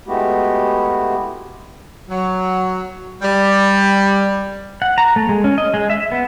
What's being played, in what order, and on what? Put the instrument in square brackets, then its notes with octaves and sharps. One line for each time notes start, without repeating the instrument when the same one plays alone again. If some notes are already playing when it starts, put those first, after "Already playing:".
[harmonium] G#3 A3 B3 E4 F#4 G4
[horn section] F#3
G3
[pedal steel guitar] F#5
A#5
A3
G#3
C#4
D#5
G#3
E5
B3